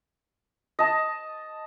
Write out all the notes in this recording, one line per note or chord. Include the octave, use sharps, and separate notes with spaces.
D#5 A5